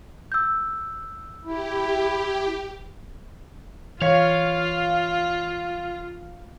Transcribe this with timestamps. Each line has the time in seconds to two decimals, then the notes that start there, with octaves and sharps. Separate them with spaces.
0.32 E6 G6
1.45 E4 G4
4.02 E3 F4 C#5 F5